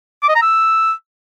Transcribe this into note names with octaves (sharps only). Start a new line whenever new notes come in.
D6
D#5
A#5
E6